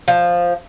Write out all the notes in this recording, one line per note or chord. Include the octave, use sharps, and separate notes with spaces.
F3